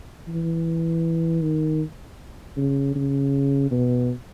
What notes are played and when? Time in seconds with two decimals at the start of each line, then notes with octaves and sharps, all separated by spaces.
0.28 E3
1.42 D#3
2.57 C#3
2.95 C#3
3.71 B2